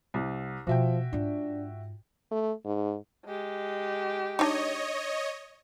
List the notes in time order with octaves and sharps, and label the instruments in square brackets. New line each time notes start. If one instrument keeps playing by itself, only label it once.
[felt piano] C2
[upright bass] B2 [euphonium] F3 [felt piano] F#4 E5 G5
[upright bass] G#2 F4 [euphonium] D4
[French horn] A3
G#2
[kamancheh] G#3 G4
[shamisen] D4 D#4 [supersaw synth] C#5 D#5